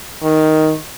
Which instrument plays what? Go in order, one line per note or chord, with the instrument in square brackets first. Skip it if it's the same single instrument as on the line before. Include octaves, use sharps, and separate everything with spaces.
[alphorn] D#3